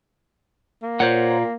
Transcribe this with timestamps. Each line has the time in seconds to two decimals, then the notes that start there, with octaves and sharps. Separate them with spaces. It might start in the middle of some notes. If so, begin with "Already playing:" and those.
0.82 A#3
1.00 A#2 C5 C#5 F#5